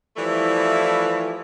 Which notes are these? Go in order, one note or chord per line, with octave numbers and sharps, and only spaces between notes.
E3 F3 G3 A3 E4